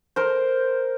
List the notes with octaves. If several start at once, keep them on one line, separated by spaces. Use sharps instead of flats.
A#4 C5